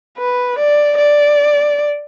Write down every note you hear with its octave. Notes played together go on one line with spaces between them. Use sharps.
B4
D5
D5